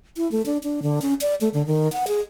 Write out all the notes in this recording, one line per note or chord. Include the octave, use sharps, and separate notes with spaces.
E4
A3
D4
D4
D3
C#4
D5
A3
D3
D#3
F#5
G#4